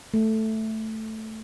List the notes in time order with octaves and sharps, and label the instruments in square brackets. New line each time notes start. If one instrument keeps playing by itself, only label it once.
[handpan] A3